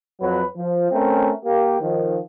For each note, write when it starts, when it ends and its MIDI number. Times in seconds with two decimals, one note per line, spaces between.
0.22 0.43 41
0.22 0.43 54
0.22 0.43 71
0.57 0.90 53
0.92 1.31 57
0.92 1.31 60
0.92 1.31 61
0.92 1.31 70
1.44 1.77 58
1.44 1.77 67
1.81 2.19 51
1.81 2.19 53